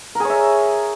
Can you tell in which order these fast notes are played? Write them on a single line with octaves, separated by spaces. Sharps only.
A#4 G#4 C#5 E5